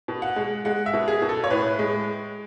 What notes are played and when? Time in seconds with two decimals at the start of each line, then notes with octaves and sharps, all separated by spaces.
0.08 B2
0.22 F#5
0.36 G#3
0.65 G#3 F#5
0.86 E5
0.93 B2
1.08 G#4
1.22 B2
1.29 A4
1.44 C#5
1.50 A2 B4
1.79 G#3